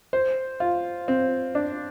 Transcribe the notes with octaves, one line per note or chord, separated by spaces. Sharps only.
C5
F4
C4
D4